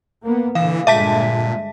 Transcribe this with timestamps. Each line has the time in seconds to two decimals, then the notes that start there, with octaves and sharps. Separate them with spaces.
0.24 A#3 B3
0.55 A#2 D3 E3 F5
0.87 G2 A#2 D3 G#3 E5 A5 B6